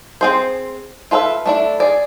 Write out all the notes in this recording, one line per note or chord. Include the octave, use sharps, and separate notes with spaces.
C4 G#4 C5
F4 A4 B4 C5 E5
A3 D4 E4
G#4 D5